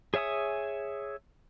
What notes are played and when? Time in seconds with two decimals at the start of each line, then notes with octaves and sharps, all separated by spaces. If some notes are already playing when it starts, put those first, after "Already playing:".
0.14 G#4 C#5 E5 G#5 D#6